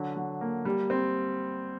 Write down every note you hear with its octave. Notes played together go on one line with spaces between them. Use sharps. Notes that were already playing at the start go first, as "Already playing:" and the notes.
Already playing: D3 F#3
F#3
A#3
G3
C4